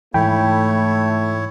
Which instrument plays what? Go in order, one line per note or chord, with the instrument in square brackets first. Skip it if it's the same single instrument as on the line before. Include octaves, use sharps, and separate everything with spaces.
[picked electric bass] G#2 E3 [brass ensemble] A3 [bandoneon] E4 C#5 [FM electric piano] G5 B5